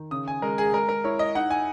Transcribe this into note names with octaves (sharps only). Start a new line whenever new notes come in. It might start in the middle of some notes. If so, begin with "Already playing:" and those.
Already playing: D#3
C#3 D#6
G#5
G#3 A#4
G#4
G#3 A#4
A#4
E4 C#5
D#5
D#4 F#5
G#5